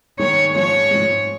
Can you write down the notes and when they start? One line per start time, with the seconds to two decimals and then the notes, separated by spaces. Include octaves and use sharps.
0.19 D#3 G#3 D#4 C#5
0.54 G#2 F3 G#3 C#5
0.91 G#2 F3 G#3